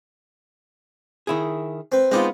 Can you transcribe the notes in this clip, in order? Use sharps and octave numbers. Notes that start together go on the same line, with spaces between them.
D#3 E4 G#4
C4 B4
G#3 B3 C4 D#4 F4 D6